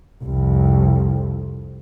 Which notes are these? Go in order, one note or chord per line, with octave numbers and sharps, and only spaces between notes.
C2 F2